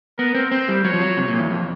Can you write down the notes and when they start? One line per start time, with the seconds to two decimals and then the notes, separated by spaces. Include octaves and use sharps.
0.18 B3 A#4
0.35 C4
0.52 C4 C5
0.68 G3
0.84 F#3 C#5
0.93 F3
1.01 F#3
1.17 C3
1.28 A#2
1.39 E2
1.50 F2